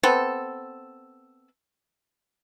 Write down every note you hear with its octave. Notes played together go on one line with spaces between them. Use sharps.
B3 C4 A4